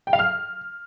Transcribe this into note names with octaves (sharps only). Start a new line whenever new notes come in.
G5
F5
F6